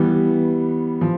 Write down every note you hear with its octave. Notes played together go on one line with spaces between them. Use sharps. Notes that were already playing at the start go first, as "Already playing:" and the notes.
Already playing: E3 G3 B3
F3